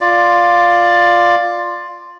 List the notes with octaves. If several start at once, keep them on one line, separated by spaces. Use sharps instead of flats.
F4 D5